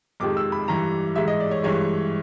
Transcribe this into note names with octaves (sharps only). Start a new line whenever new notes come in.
F2 C3 D#3 G#3 D6
E6
B5
G2 E3 G3 A#5
G#2 E3 G#3 E5
D#5
D5
C#5
G2 E3 G#3 C#5